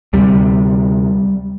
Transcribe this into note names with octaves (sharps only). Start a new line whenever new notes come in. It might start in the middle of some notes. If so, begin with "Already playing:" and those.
D2 C3 G3